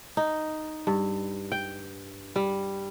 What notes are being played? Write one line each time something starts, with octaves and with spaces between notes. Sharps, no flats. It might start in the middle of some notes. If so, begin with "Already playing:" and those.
D#4
G2
G5
G3